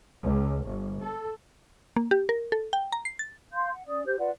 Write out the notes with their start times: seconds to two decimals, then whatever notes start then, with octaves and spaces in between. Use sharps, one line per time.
0.24 C#2
0.66 G1
1.02 A4
1.96 A#3
2.11 G4
2.29 A#4
2.52 A4
2.73 G5
2.92 A#5
3.05 C7
3.19 A6
3.52 F5 C6 G6
3.72 F#5
3.87 C#4 D5 D#6
4.06 G4 C5 G6
4.19 F4 B4 D5 F#5